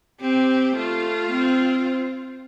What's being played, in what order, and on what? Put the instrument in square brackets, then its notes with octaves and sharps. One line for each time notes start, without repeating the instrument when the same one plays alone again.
[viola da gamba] C4 [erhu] G4
[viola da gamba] A3 [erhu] F4
[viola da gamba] C4